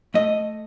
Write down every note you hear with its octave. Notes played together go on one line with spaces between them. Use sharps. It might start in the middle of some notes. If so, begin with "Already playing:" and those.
A3 D#5